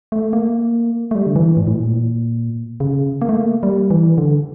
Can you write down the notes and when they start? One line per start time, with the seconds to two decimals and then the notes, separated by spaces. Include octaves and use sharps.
0.12 A3
0.33 A#3
1.11 A3
1.15 G3
1.27 D3
1.36 E3
1.57 A2
1.67 A2
1.77 A#2
2.80 C#3
3.21 A#3
3.29 A3
3.36 A#3
3.63 G3
3.90 E3
4.18 D3